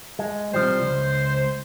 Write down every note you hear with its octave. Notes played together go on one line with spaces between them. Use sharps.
G#3
C3 F3 G3 C5
C#2